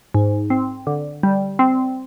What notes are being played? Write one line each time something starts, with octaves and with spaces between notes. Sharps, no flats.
G#2
C4
D3
G3
C4